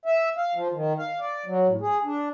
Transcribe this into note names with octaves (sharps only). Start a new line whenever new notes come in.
E5
F5
F3
D#3
F5
D5
F#3
A2
G#4
D4